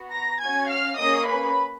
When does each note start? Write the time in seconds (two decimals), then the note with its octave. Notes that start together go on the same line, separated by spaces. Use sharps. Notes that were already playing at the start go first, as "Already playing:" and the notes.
Already playing: B3 F#4
0.11 A#5 A#6
0.40 C#4 F#4 G#5 G#6
0.69 F5 F6
0.98 A#3 C#4 G#4 D#5 D#6
1.27 B4 B5